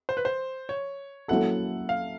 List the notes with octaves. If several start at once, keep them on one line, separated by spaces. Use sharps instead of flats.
C5
B4
C5
C#5
F#3 A#3 C#4 E4 A4 F#5
F5